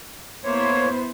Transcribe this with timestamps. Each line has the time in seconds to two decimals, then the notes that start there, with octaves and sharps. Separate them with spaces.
0.44 A#3 B3 E4 C5 C#5